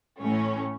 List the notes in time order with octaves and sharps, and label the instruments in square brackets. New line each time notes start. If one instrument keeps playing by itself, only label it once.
[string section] A1 A2 A3 C#4